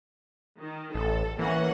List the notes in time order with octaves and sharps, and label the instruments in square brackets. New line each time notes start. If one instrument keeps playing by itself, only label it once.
[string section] D#3
[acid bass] A1 [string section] A4
[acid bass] E3 [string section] A#3 C#4 F#5